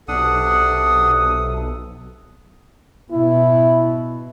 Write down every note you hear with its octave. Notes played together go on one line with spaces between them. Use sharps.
B1 C3 D4 A4 F#5 D#6
B2 E4